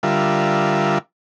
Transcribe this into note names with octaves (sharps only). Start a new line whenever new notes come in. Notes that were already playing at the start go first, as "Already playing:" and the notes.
D3 G3 F4 A#4 E5